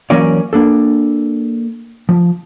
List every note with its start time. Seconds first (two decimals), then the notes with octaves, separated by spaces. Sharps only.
0.10 E3 F#3 A#3 C#4 C#5 D5
0.53 A#3 D4 A4
2.09 F3